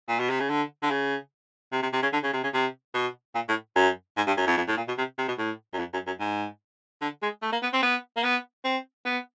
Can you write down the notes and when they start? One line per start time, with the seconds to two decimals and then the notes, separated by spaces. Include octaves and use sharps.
0.08 A#2
0.19 B2
0.29 C3
0.40 C#3
0.50 D3
0.82 D3
0.91 C#3
1.72 C3
1.82 C3
1.93 C3
2.02 C#3
2.13 D3
2.23 C#3
2.33 C3
2.43 C#3
2.54 C3
2.94 B2
3.35 A#2
3.49 A2
3.76 F#2
4.16 G#2
4.27 G2
4.37 F#2
4.47 F2
4.57 F2
4.68 A2
4.77 A#2
4.88 B2
4.98 C3
5.18 C3
5.28 B2
5.38 A2
5.73 F#2
5.79 F2
5.93 F#2
6.07 F#2
6.20 G#2
7.01 D3
7.22 G#3
7.42 A3
7.52 A#3
7.63 B3
7.73 C4
7.83 B3
8.17 A#3
8.23 B3
8.64 C4
9.05 B3